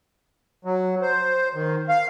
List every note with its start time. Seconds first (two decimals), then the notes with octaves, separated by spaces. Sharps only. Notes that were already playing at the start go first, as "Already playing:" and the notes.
0.65 F#3
1.02 C5
1.54 D#3
1.89 F5